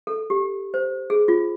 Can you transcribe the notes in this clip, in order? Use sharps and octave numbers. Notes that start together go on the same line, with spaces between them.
A4
G4
C5
G#4
F4